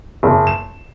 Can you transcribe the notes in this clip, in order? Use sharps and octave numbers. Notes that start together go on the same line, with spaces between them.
F#1
E7